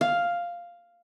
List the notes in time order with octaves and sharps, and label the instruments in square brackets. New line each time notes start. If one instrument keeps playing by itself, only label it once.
[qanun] F5